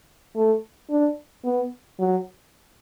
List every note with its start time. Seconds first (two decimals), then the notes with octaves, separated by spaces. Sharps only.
0.36 A3
0.90 D4
1.45 B3
1.99 F#3